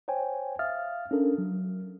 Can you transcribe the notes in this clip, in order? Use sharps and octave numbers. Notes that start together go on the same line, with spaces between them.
C5 C#5 G5 G#5
E5 F5 D#6 F6 A6
C#4 D4 A4 A#4
F#3